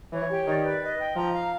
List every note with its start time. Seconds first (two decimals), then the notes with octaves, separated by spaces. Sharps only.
0.12 E3 C#5
0.30 G4
0.47 D#3 D5
0.64 B4
0.81 D#5
0.99 G5
1.15 F3 A#5
1.33 F5